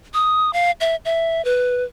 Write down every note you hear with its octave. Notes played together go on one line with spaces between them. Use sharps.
D#6
F5
E5
E5
B4